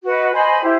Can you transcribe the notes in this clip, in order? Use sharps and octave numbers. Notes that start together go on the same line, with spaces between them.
F#4 B4 D#5
C5 D#5 G#5 B5
E4 G4 C5